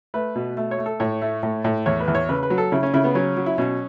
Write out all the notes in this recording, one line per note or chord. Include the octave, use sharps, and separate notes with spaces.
A3 B4
B2
A3
C#5
A3
A4
A2 C#5
A3
A2
A2
E2 C#5
B4
E2
C#5
C#3 B4
B4
F#3
A4
C#3 E4
C#4
C#3 E4
B3
F#3 C#4
F#3
E4
B2 C#4